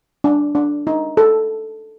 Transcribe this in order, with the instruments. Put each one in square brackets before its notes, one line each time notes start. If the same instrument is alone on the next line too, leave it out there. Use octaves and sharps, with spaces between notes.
[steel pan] D4
D4
D#4
A4